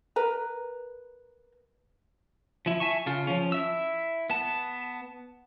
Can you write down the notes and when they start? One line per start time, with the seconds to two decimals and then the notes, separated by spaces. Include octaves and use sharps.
0.16 A#4 B4 A#5
2.66 F3 E4
2.80 E5 G#5 A5 C#6
3.06 C#3 F4
3.27 F3 C#4
3.52 E4 E5 E6
4.30 B3 A5